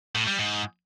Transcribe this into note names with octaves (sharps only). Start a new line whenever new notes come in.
A2
G3
G#2